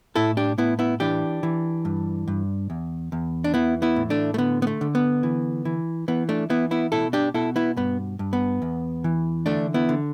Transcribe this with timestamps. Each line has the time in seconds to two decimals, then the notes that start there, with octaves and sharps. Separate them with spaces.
0.16 A2 E4 A4
0.37 D4 G4
0.58 A2 B3 E4
0.79 B3 E4
1.00 E3 D4 G4
1.43 E3
1.85 G2
2.28 G2
2.70 E2
3.12 E2
3.44 D4
3.54 E3 B3 E4
3.82 B3 E4
3.96 A2
4.10 A3 D4
4.34 A3
4.38 D3 B3
4.62 B3
4.67 A3
4.81 D3
4.95 B3
5.23 E3
5.65 E3
6.08 E3 B3
6.29 A3 D4
6.50 E3 B3 E4
6.71 B3 E4
6.92 B2 E4 A4
7.13 D4 G4
7.34 B2 E4 A4
7.56 B3 E4
7.77 G2 B3
8.19 G2
8.33 B3
8.62 E2
9.04 E3
9.46 D3 A3 D4
9.74 B3 E4
9.89 D3